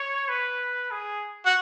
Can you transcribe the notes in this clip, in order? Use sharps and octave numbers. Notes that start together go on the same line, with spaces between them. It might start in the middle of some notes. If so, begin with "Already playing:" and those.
Already playing: C#5
B4
G#4
F#4